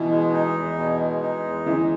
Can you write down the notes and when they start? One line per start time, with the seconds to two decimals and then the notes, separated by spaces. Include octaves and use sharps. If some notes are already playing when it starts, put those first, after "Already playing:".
Already playing: B2 E3
0.11 G#3
0.33 D#4
0.54 E2
0.77 B2
0.99 G#3
1.22 D#4
1.43 E2
1.66 E3 G#3